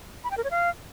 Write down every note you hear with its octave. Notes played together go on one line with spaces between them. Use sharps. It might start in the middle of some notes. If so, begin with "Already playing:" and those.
B5
G5
A#4
C#5
F5